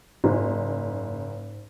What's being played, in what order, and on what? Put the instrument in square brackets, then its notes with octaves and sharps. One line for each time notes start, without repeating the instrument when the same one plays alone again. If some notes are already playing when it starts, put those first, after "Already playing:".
[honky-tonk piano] F#1 [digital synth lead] G#2